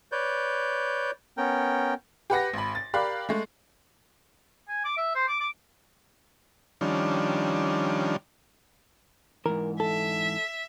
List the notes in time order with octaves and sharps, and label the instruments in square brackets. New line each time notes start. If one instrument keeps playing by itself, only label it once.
[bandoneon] B4 C#5 D5 G6
B3 C#4 A#4 G5
[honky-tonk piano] G4 B4 F#5 A#6
G#1 B5
A6
G4 A#4 D5 F5 B5 F#6
G#3 A3
[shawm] G#5
D6
E5
C5
D6
D6
[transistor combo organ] D#3 F3 G3 C#4 D4
[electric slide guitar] G#2 E3 [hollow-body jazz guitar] A#4
[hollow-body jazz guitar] A4 [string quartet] E5